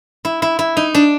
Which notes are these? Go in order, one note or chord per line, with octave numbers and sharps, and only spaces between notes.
E4
E4
E4
D#4
D4